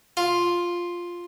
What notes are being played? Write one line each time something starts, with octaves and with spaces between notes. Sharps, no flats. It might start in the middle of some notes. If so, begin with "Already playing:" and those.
F4